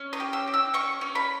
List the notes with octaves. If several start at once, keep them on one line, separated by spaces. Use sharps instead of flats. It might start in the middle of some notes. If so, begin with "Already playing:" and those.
Already playing: C#4
D#6
G4
E6
G4
E6
C#4 C#6
C#4
B5